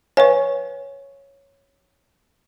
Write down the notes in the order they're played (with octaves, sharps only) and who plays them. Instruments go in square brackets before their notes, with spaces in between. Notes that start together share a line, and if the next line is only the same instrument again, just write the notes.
[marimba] B4 G#5 [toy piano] C#5 F5 C#6